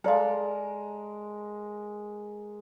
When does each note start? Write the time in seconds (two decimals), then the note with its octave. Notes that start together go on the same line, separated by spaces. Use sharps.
0.04 G#3 A4 A#4 D5 F5